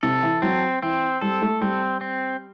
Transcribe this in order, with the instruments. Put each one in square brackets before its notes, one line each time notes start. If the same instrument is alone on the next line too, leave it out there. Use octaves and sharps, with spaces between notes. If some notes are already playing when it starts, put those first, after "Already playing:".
[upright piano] C3 [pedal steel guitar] A4
[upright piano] E3
[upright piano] F#3 [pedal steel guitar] C4
[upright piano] E3 [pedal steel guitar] C4
[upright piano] G3 [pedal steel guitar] A4
[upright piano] A3
[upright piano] G3 [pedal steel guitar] C4
[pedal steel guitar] C4